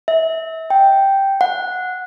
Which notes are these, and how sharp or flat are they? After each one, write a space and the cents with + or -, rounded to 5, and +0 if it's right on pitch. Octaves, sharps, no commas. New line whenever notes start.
E5 -30
G5 -5
F#5 -15